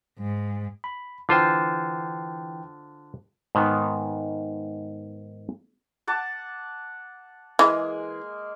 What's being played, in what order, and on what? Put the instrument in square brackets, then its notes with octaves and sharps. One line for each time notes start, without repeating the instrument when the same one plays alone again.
[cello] G#2
[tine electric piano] B5
[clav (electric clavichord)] D3 F4 C5 [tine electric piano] E3 G5
[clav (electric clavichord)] G#2 D#3 B3
[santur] F#5 A5 D6
[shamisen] E3 [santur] G#3 A#3 G#4